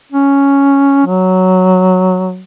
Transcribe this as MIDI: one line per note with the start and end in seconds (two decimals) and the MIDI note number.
0.12 1.02 61
1.06 2.42 54